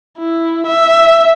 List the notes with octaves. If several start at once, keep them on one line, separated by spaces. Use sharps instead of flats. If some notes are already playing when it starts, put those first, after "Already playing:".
E4
E5